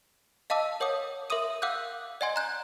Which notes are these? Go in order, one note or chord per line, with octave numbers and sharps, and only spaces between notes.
D#5 F5 A5 D6 E6
A#4 C#5 F#5 D6 D#6
A#4 E5 C6 D6 D#6 D#7
F5 F#5 D6 E6 F#6 G6
D5 D#5 F#5 G#5 C6 G#6
A#5 F#6 G6